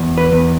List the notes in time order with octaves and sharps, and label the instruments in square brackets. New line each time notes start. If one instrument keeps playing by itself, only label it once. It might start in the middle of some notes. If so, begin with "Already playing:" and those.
Already playing: [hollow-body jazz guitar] E2
B4
E2